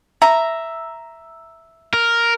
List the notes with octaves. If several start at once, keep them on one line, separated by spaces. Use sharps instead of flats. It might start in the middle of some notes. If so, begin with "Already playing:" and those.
E5 A#5
A#4